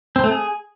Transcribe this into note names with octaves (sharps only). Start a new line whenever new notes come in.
C4
A3
G#4